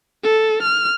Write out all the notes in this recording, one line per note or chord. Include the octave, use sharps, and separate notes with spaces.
A4
F6